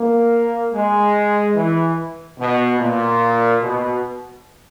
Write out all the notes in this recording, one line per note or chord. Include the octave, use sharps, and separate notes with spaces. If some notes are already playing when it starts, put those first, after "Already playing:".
Already playing: A#3
G#3
E3
B2
A#2
B2